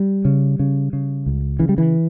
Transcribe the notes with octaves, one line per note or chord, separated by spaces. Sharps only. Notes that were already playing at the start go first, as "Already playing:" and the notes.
Already playing: G3
C#3
C#3
C#3
C#2
C#3 E3
G3
E3